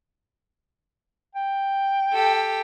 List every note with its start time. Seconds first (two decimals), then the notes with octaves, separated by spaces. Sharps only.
1.35 G5
2.13 G4 A4